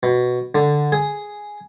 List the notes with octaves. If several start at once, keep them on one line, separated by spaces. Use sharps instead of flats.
B2
D3
G#4